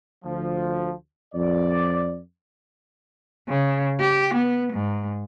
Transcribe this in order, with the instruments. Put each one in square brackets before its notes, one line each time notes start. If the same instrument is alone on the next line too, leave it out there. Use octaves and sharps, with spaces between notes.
[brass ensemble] D2 F3
F2 D5
[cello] C#3
G4
B3
G#2